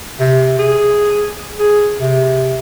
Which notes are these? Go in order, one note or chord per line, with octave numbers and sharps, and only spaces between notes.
C3
G#4
G#4
C3